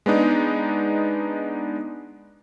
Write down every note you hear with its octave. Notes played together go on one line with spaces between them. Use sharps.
G#3 B3 D4 D#4